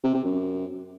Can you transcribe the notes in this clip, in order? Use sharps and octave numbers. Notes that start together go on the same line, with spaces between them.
C3
C3
F#2